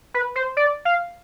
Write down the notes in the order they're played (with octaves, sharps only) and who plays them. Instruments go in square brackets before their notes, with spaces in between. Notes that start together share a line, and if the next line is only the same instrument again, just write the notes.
[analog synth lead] B4
C5
D5
F5